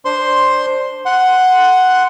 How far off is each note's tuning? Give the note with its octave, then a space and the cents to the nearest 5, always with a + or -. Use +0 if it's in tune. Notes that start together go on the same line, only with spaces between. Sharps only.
D4 +0 C5 +0 C6 +5
F#5 +0 C6 -10